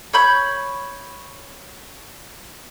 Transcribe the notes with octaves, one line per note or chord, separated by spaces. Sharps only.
C#5 B5 G6